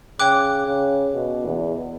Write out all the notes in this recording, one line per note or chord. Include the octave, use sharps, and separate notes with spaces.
C#3 C#5 G5 D6 F#6
C#3
B2
E2